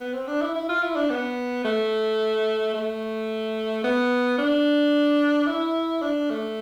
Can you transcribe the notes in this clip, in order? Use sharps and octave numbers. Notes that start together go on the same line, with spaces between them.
B3
C4
D4
E4
E4
F4
E4
D4
B3
A3
A3
B3
D4
E4
D4
A3